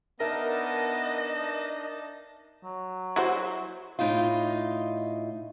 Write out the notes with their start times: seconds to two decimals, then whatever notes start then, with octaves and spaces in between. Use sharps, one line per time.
0.20 B3 D4 D#4 A#4 D#5 E5 A5
2.63 F#3
3.16 E4 F#4 C5
3.99 A2 D#4 F4